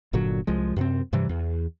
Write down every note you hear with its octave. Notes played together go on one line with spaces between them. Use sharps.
G1 A#2 D3 F#3
C2 F3 G#3
F#2 C3 C4
G2 C3 E3 G3
E2